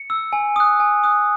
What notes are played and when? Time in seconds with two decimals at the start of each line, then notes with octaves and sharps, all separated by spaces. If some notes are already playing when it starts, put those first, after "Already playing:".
Already playing: C#7
0.10 E6
0.33 G#5
0.56 D#6 F#6
0.80 G#5
1.04 D#6 F#6